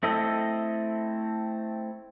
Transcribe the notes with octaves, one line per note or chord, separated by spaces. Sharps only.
A3 C4 E4 A4 D#5